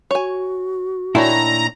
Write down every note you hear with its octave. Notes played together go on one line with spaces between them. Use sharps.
F#4 C#5 G#5
A#2 D#3 A3 D4 E4 C#5 A#5